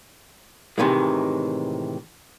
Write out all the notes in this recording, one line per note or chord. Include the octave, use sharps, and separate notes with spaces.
A2 C3 D#3 E3 G#3